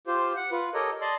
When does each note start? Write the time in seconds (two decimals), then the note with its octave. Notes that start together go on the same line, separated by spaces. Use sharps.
0.07 F4 G4 C5
0.36 F#5
0.51 F4 B4
0.74 G4 A4 A#4 C#5 D#5
1.01 D5 D#5 A5 C6